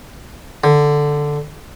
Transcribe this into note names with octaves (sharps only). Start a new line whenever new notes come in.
D3